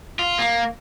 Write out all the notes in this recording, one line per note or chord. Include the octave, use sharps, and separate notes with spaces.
F4
A#3